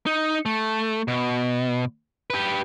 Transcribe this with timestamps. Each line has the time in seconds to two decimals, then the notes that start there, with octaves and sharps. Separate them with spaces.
0.06 D#4
0.46 A3
1.08 B2
2.30 G4 B4